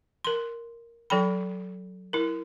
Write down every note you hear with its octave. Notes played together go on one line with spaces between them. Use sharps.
A#4 C6
F#3 A4 G5 B5
E4 A#4